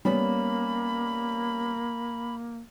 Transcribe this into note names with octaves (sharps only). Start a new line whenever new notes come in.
G3 A#3 B3 C#4 B5